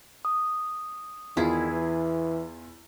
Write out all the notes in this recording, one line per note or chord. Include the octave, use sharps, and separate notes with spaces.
D#6
E2 D#3 E4 F4 G#4
E3